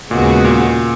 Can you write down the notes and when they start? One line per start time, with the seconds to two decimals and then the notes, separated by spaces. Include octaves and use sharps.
0.11 D#2 A#2 C#3 G#3 B3 F#4
0.44 A#2